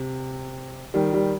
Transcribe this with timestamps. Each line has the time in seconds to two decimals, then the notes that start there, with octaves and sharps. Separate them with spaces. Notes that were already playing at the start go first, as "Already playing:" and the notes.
Already playing: C3
0.94 D#3 G3
1.13 D#3 G3